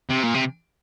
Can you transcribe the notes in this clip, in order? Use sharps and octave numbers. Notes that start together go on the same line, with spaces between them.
C3
A#2
C3